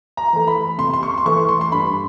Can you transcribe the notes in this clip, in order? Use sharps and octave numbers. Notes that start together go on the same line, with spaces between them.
A#5
E3 A3
B5
C3 C6
C6
C#6
C6
E3 A3 C#6
C6
C6
G2 B5